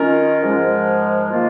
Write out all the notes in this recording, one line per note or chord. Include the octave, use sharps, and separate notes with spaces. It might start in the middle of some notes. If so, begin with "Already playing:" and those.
Already playing: D#3 C#4 F4 A#4
G#2 F3 G#3
D#3 A#3 F4